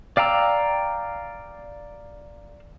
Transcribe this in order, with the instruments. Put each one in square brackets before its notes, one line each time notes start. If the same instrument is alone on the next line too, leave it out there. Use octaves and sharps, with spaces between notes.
[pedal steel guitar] D5 F5 G5 A#5 E6